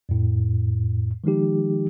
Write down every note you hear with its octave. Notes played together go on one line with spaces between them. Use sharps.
F2 A2
D#3 F3 G#3 D#4 G4